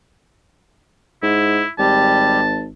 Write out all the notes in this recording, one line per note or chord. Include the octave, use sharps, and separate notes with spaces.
G#2 E4
G#1 G3 G4 A5